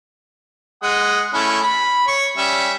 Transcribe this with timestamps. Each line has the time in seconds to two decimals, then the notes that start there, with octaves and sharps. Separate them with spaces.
0.83 G#3 F#5 D#6
1.34 A3 C#4 E4
1.63 B5
2.08 C#5 C#6
2.37 G3 C#4 E5